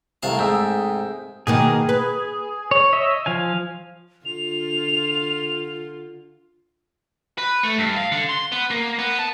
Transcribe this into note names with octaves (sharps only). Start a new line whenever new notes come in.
C2 C3 A3 A#4 F5 A5
G#2 G#4 E5 G5
B2 D#3 A#3 G#4
B4
C#5
C#5 D#5 E5
F3 F5 G#5
D3 F4 F7
B4
A3
G2
F5
D3
C6
B3
A#3
B3
A5